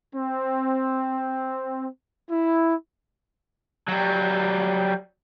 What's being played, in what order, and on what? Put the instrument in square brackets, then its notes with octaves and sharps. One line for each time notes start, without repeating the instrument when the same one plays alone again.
[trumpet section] C4
E4
[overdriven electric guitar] F#3 G3